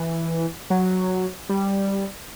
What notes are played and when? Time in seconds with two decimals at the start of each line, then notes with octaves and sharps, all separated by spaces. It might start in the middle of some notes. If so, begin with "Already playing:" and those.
Already playing: E3
0.70 F#3
1.49 G3